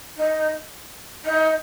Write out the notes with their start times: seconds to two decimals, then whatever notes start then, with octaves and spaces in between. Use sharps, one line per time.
0.17 D#4
1.25 D#4